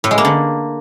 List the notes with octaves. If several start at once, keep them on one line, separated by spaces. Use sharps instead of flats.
A2
G#3
A#3
D3